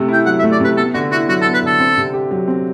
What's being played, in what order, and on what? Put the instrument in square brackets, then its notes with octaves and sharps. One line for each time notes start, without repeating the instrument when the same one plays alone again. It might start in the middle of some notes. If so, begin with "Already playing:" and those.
Already playing: [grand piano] C3 A3
[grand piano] E4 [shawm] G5
[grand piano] F#3 [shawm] F#5
[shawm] E5
[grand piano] A3
[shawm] D5
[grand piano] C3 [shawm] B4
[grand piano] B3 [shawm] A4
[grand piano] D3 [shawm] F#4
[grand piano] E4 [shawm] F#4
[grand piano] F#3 [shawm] F#4
[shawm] A4
[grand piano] B3
[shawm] B4
[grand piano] D3 [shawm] A4
[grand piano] C4
C3
G4
F#3
C4